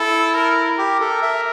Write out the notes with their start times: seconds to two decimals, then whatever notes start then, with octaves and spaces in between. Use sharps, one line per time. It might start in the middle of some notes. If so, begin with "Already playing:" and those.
Already playing: E4 A4
0.34 A#4
0.78 G4
1.00 A4
1.22 E5